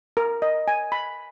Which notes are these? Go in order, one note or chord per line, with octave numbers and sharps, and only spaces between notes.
A#4
D#5
G#5
B5